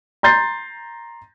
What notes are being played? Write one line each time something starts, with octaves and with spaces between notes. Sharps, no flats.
A#5 C6 G6 A6 C7